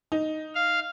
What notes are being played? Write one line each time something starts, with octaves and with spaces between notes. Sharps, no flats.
D#4
F5